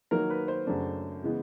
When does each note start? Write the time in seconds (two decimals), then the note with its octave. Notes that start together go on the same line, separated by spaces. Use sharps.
0.11 D#3 F#3 A#3 D#4 A#4
0.30 B4
0.48 C5
0.67 F#2 C#3 F#3 A3 D4
1.23 C#3 E3 G#3 B3